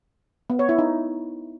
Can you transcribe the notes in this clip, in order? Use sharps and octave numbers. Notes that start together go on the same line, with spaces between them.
B3
C#5
E4
D#4